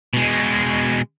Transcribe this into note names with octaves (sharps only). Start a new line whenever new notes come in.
B2 G#3